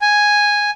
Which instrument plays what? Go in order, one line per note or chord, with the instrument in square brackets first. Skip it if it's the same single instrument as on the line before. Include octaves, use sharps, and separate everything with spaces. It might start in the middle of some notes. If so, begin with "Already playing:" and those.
[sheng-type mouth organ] G#5